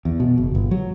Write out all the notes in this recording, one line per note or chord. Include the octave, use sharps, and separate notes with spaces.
E2
B2
F#1
G1
F#3